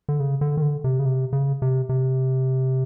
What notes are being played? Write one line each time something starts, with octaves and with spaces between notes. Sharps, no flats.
D3
C#3
D3
D#3
D3
C3
C#3
C3
C#3
C3
C3